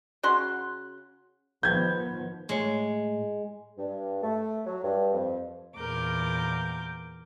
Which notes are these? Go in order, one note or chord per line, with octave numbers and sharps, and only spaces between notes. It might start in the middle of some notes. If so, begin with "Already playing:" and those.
C#3 F#4 F#5 C6
D#3 F3 B3 G6 G#6
A2 G#3 C#5
G2
A3
F#3
G2
F2
E2 A#2 A#4 D6 G6